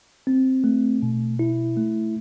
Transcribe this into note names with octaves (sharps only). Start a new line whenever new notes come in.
C4
A3
B2
E4
A3